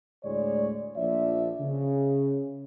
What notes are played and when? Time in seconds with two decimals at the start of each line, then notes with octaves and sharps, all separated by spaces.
0.24 D2 A2 G#3 C#5 D5
0.96 A#1 F3 D5 E5
1.60 C#3